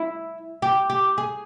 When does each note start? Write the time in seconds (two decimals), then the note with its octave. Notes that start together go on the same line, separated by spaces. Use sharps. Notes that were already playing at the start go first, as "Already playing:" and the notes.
Already playing: E4
0.62 G4
0.90 G4
1.18 G#4